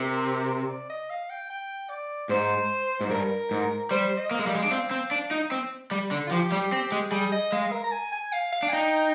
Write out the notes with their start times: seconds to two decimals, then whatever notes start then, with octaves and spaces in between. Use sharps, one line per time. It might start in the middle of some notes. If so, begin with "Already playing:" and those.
Already playing: C3 A#4
0.69 D5
0.90 D#5
1.10 F5
1.30 G5
1.50 G5
1.89 D5
2.29 G#2 C5
3.01 G#2
3.10 G2 A#4
3.51 G#2
3.91 G3 C5
4.17 D#5
4.31 A#3
4.39 G#3
4.44 G3 F5
4.55 G#3
4.64 D4
4.71 C4 F5
4.91 C4
5.11 D4
5.31 D#4
5.52 C4
5.91 G3
6.11 D3
6.27 F4
6.31 F3 G4
6.52 G3
6.72 C4
6.92 G#3
7.11 G3 G#4
7.32 D#5
7.52 G#3 F5
7.72 A#4
7.84 A#5
7.92 G#5
8.12 G#5
8.33 F5
8.52 F5
8.63 D4
8.69 G#5
8.72 D#4 G5